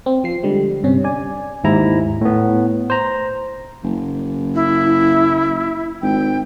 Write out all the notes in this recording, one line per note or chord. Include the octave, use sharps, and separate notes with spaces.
C4
F3 C7
D3 G3 G#3
G2 C3 C#4
D5 G#5
D#2 G#2 E4 A#5
A2 B3
C5 A#5
F#1
E4
G#1 G5